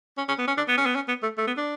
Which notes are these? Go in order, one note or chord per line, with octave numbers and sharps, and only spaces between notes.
C#4
C#4
B3
C#4
D4
B3
C#4
B3
C#4
B3
A3
A3
B3
D4